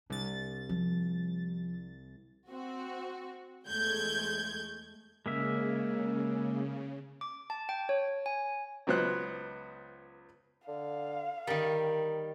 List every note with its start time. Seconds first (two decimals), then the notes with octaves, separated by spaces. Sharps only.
0.10 C2 D4 A6
0.69 F3
2.48 C4 F#4
3.66 E2 G#3 A3 G6 G#6
5.26 C#3 G#3 A#3 E5
7.21 D6
7.50 A5
7.69 G5
7.89 C#5
8.26 G#5
8.87 C#2 F#3 B3 C5 F#6
10.68 D3 F5
11.47 D#3 G3 A#4